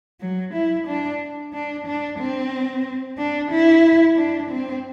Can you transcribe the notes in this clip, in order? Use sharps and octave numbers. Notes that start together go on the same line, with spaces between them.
F#3
E4
D4
D4
D4
C4
D4
E4
D4
C4